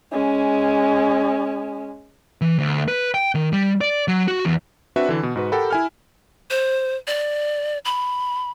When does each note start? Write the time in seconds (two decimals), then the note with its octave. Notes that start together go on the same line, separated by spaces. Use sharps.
0.12 G#3 C#4
2.42 E3
2.59 D2
2.88 B4
3.14 G5
3.35 D#3
3.53 G3
3.81 D5
4.08 F#3
4.28 F#4
4.45 E2
4.96 C4 D4 F#4 B4 E5
5.09 D3 E3
5.23 B2
5.36 G#2 F#4 B4
5.52 G4 A4 A#4 F#5 G5 B5
5.71 E4 G#5 F6
6.50 C5
7.07 D5
7.85 B5